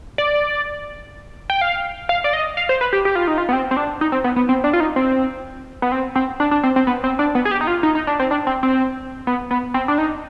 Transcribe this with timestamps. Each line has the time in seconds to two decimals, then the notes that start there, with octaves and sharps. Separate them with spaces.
0.18 D5
1.50 G5
1.61 F5
2.09 F5
2.24 D5
2.33 D#5
2.57 F5
2.69 C5
2.81 B4
2.93 G4
3.05 G4
3.15 F4
3.27 D#4
3.38 F4
3.49 B3
3.53 C4
3.71 C4
3.77 D4
4.01 D#4
4.12 C4
4.24 B3
4.36 B3
4.49 C4
4.64 D4
4.73 F4
4.80 D#4
4.96 C4
5.82 B3
5.92 C4
6.16 C4
6.40 D4
6.51 D4
6.64 C4
6.76 C4
6.87 B3
7.04 C4
7.19 D4
7.35 B3
7.45 G#4
7.51 G4
7.61 D#4
7.67 F4
7.83 D#4
7.95 D#4
8.07 D4
8.20 C4
8.31 D4
8.47 C4
8.63 C4
9.27 B3
9.51 B3
9.74 C4
9.88 D4
9.98 D#4